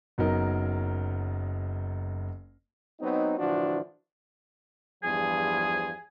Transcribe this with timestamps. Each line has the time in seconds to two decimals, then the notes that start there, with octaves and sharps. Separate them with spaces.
0.18 F#1 F#3 B3 D#4 A#4
3.01 F#3 B3 C4 D#4
3.38 A2 D3 E3 F3 D4 F#4
5.04 E2 G2 F3 G#4